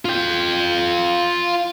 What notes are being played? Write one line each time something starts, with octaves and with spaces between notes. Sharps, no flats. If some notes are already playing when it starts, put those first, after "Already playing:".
F4 G5